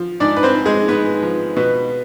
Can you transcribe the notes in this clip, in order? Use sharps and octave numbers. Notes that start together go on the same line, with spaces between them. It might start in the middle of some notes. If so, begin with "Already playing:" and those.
Already playing: F3
G#2 D4 D5
B4
C4 C5
G#2
G#3 G#4
G#2 B3 B4
F3
B2 B3 B4